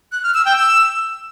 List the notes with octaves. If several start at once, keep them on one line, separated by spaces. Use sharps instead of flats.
F#6
F6
E6
G5
E6